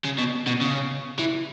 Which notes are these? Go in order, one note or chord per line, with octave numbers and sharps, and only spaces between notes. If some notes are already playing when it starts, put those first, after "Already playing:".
C#3
B2
B2
C#3
E3